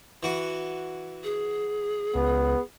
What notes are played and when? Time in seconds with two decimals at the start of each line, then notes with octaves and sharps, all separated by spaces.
0.23 E3 F#4
1.24 G#4
2.15 C#2 B3